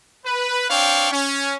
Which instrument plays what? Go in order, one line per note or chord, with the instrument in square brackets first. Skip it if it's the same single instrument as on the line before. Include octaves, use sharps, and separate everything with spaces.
[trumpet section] B4
C4 D4 C#5 F5 G5 C#6
C#4